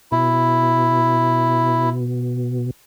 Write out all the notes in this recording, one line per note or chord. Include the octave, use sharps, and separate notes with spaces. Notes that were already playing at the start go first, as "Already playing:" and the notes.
B2 E4